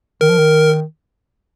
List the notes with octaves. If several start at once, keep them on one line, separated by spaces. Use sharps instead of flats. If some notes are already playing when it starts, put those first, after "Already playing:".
D#3 A#4
F3
D#3